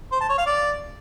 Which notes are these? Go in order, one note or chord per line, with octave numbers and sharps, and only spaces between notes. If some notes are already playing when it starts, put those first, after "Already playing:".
C5
A5
C#5
F5
D5